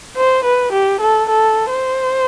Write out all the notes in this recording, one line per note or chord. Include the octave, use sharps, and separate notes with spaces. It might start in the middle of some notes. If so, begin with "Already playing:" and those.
C5
B4
G4
A4
A4
C5